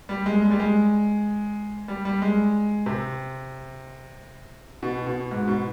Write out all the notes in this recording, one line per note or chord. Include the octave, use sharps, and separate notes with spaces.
G3
G#3
G#3
G3
G#3
G3
G3
G#3
C3
B2
B2
G#2
B2